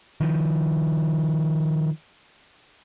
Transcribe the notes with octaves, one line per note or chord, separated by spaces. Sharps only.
D#3 F3